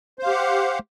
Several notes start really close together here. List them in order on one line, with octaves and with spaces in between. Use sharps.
C5 F5 G4 F#5